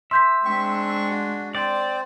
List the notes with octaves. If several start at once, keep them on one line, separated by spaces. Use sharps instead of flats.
E5 C6 G6 B6
G#3 C4 D4 C#6
F#4
C4 C5 D5 A6